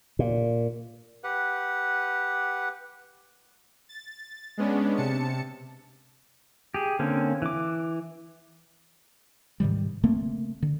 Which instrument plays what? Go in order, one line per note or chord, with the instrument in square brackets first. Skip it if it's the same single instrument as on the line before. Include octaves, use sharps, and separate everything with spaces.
[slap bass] A#2
[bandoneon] G4 B4 F#5
[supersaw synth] A6
G#3 B3 C#4 D4
C3 A5 C#7
[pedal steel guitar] G4 G#4
D3 A#3 C4 C#4
E3 D6
[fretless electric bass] G#2 C3 D#3 G3
C#3 A3 A#3 C4
D3